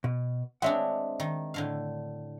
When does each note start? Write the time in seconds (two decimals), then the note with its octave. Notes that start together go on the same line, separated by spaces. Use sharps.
0.04 B2
0.62 G#3 C4 D4 C#5 E5 F#5
1.20 D#3
1.54 A2 D3 F5